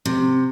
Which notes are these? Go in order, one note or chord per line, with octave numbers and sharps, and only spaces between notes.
C3